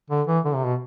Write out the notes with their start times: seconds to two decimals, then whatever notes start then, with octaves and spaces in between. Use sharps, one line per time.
0.10 D3
0.27 E3
0.45 D3
0.55 C3
0.64 B2